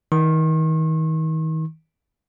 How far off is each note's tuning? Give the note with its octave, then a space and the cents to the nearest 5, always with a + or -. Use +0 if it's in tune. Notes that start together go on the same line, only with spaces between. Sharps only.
D#3 +35 C#6 -45